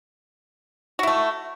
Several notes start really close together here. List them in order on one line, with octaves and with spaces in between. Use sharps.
F#4 E4 A3